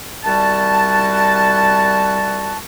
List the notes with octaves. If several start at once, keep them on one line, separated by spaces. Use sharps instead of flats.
C2 G3 F#4 A5